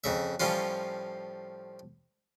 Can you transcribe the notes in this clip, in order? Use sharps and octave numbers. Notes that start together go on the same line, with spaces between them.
F2 C#3 E5
A2 F3 G3 C#4 F4